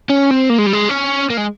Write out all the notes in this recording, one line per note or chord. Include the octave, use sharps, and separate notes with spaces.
C#4
C4
A#3
G#3
G3
G#3
C#4
A#3
G#3